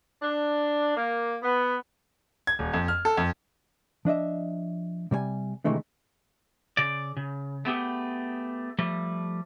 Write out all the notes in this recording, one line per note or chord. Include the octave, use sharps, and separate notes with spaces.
D4
A#3
B3
G#6
D#1
F2
F6
A4
F2
F3 D4 D#5 E5
C3 G3 C#5 G#5
C3 D#3 E3 G#3 A3 D4
C#3 D5
C#3
A3 B3 G4 G#4
F3 G3 A3